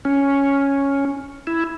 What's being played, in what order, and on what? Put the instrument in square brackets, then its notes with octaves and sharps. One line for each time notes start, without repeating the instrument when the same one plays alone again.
[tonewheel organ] C#4
E4